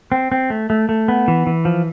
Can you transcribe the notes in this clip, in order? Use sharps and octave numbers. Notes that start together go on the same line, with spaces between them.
C4
C4
A3
A3
A3
B3
E3
E3
F3